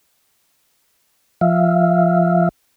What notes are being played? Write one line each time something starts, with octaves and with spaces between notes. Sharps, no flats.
F3 E5 F5